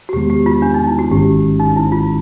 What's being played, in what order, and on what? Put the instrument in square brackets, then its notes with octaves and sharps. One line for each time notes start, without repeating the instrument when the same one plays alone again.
[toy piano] F#4
[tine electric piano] E2 C3 D#3 G#3 B3 [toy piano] G4
[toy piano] G4
F4
D4
D#4
E4
F#4
[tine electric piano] G#1 G#2 D#3 G#3 C#4 [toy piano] G4
[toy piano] D#4
E4
F4